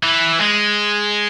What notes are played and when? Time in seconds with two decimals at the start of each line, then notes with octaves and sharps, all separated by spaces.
0.03 E3
0.41 G#3